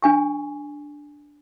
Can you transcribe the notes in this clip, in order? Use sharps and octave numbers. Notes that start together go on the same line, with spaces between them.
D4 G#5 C#6